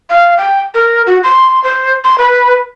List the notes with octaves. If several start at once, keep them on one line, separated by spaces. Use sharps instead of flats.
F5
G5
A#4
F#4
C6
C5
C6
B4